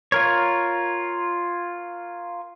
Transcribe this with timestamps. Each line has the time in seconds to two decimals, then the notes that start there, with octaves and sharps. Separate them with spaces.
0.12 F4 A#4 C#5